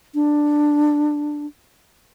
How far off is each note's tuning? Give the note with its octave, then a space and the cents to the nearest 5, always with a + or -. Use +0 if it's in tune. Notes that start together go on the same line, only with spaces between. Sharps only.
D4 +10